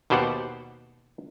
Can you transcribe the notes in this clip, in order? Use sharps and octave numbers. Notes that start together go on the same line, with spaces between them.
D#2 B2 G4 C5 D5 F#5